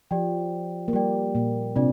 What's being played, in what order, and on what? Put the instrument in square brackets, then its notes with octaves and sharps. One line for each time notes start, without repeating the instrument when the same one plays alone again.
[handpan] F3 [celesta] G4 D5 G5
[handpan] A#3
[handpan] G3 [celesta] G4 D5 G5
[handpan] A#2 A#3
[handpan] C3 C4 [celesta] D4 F4 D5